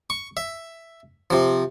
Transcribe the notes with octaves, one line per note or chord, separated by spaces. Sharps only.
C#6
E5
C3 F3